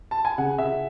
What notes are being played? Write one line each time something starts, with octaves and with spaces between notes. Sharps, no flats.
A5
G#5
C#3 F#5
C#3 E5